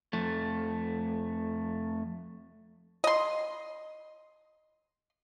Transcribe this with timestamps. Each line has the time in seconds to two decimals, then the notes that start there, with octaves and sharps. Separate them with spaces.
0.13 F2 A3
3.04 D#5 C6